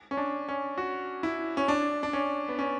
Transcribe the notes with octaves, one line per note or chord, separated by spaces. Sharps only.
C#4
D4
C#4
F#4
E4
C#4
D4
D4
C#4
B3
C#4